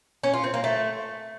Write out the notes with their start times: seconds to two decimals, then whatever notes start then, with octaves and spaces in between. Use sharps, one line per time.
0.23 C#4
0.34 F4
0.44 C4
0.54 A#3
0.64 A3